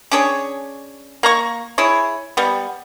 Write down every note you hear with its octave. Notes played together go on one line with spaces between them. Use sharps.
C#4 D4 G#4 C#5
A#3 A#5 C#6
E4 G#4 C#5
G3 B3